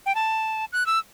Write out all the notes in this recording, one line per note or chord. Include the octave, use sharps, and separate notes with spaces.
G5
A5
F#6
E6